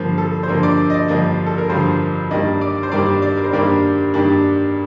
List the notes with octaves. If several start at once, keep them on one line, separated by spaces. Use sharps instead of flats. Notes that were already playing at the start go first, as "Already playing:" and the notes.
Already playing: G2 D3 F3 A#3
A4
C5
G2 D3 F3 A#3 A#4
D5
D#5
D5
G2 D3 F3 A#3 D#5
A4
A#4
G2 D3 F3 A#3 C5
G2 D#3 G3 A#3 D4 D#5
D5
C5
G2 D#3 G3 A#3 D4 D5
D5
A#4
C5
G2 D#3 G3 A#3 D4 D5
G2 D#3 G3 A#3 D4